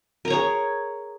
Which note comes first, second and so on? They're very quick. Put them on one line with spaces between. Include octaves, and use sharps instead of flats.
A#4 A#5 C#5 G#4